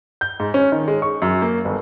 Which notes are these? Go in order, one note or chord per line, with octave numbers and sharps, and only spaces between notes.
G6
G#2
C#4
D#3
G#3
C#6
F#2
A#3
G1